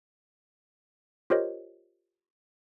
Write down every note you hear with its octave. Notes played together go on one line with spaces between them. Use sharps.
F4 G4 A#4 C5 C#5 D#5